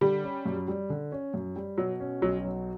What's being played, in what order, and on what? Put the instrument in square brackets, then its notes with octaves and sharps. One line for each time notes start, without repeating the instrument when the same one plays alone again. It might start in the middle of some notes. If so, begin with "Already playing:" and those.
[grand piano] D3 [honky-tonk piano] G3
[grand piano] C#4
F#2
G3
D3
C#4
F#2
G3
[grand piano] B2 [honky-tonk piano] F#3
[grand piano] C#4
[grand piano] B1 [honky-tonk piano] F#3
[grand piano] F#3